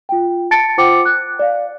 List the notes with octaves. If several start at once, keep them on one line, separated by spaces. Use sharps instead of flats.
F4 G5
A5 A6 C#7 D7
F4 C5 F#5 G5 D6 C#7
F#6
D5 F5